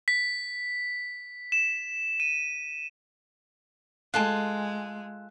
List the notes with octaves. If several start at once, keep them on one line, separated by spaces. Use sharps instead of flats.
B6
E7
D#7
G#3 F4 A4 G#5 F#6